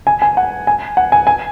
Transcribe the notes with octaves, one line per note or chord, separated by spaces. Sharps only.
G#5
G#5
F#5
G#5
F#5
G#5
G#5